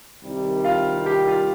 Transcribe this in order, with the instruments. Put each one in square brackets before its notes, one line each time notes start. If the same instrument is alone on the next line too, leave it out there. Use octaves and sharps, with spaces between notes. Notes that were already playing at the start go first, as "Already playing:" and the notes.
[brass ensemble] C2 C3 D#3 G3
[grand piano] F4 F5
G4 G5
F4 F5